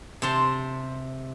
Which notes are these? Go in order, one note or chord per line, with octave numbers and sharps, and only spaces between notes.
C3 C5 A5 C6